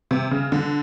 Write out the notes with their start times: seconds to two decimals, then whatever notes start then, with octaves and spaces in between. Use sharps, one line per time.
0.11 C3
0.31 C#3
0.52 D3